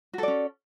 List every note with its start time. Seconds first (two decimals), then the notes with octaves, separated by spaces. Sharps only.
0.14 F#4
0.18 A4
0.23 D5
0.28 C#4